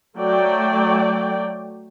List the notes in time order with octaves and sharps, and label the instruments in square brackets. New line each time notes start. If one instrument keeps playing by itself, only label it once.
[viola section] F#3 A3 D5 G5